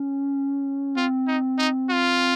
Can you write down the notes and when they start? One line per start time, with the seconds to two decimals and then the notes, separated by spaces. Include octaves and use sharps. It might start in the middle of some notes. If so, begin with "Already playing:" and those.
Already playing: C#4
0.96 C4 F4
1.28 D#4
1.58 D#4
1.90 F4